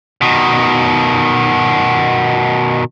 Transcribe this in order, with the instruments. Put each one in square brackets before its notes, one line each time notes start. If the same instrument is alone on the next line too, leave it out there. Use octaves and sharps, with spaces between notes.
[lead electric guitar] B2 D#3